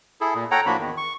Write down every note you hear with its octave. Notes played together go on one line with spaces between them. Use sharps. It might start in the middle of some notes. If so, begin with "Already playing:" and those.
E4 G#4 A4
A#2
A4 C#5 F#5 G5 A#5
A2 F3 A#3 D4 F#4 B5
E2 D#3
C#6